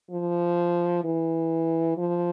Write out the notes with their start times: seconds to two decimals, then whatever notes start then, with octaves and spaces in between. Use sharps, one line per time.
0.11 F3
1.04 E3
1.97 F3